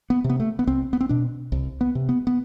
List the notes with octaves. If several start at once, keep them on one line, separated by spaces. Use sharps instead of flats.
B3
C3
B3
A3
B3
C2 C4
B3
C4
B2 D4
C2
B3
C3
B3
B3